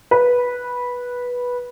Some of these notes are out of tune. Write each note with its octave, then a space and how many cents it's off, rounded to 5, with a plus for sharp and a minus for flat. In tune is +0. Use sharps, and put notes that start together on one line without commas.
B4 -10